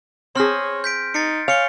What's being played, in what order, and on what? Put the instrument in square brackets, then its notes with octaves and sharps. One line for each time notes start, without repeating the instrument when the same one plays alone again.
[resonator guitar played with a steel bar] C4 G#4 [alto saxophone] C#5 [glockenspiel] C6 F6 A#6
[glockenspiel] G6 B6 D7
[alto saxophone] D#4 [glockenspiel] A6 C7 C#7
[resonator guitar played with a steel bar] C#5 [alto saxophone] F5 [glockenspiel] G#5 C#7 G7